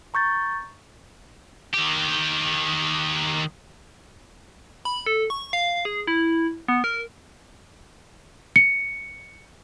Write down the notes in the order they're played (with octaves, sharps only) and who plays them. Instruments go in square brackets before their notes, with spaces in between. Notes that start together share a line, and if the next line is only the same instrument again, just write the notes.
[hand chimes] A#5 C#6 G6 A6
[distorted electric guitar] D#3 G4
[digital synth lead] B5
A4
C#6
F5
G#4
E4
B3
A#4
[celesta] C#7